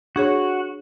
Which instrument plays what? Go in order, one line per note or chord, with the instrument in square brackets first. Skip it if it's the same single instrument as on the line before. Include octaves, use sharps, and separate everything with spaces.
[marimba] D4 G#4 C#5 [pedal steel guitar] F#4